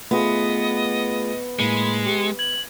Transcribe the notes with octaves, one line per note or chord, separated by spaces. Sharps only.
A3 B3 F4 G#4 D#5
A2 G#3 A#3 B5 C#7
G4 C#7
G#6 F#7